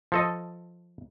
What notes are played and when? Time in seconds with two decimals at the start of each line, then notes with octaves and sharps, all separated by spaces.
0.12 F3 A4 D#5